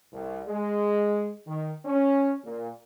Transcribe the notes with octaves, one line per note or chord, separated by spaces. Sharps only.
C2
G#3
D#3
C#4
A#2